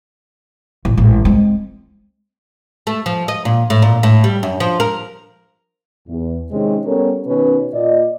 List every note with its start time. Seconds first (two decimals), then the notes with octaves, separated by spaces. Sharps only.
0.85 A1
0.97 A1 G#2
1.25 G#3 C4
2.87 A3
3.06 F3
3.28 D#5
3.45 A#2
3.70 A2
3.82 A#2
4.03 A2
4.24 G3
4.43 F#2
4.60 F3
4.80 A#4
6.08 E2
6.52 C3 D#3 G#3 C4 C#4
6.85 G3 B3 C#4 A4 A#4 C#5
7.27 B2 D#3 C#4 B4
7.73 A#2 D5 D#5